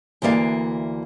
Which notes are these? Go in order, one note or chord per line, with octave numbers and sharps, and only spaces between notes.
D2 E3 A#3 D5 F5